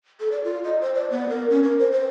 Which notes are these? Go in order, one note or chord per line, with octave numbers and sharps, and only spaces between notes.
A4
D5
F4
D#5
C5
D5
B3
A#4
C#4
A#4
C5
C5